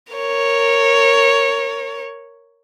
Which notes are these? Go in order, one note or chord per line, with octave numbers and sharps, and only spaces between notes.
A#4 C#5